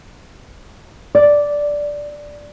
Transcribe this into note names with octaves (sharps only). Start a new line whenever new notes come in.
D5